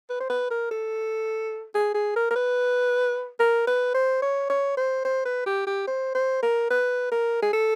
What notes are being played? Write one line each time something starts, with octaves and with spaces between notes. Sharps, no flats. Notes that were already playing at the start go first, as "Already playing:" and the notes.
B4
C5
B4
A#4
A4
G#4
G#4
A#4
A#4
B4
A#4
B4
C5
C#5
C#5
C5
C5
B4
G4
G4
C5
C5
A#4
B4
A#4
G#4
A4